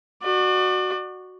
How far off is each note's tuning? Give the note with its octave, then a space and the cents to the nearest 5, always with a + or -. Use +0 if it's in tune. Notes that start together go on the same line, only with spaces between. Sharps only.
F#4 +0 D5 +35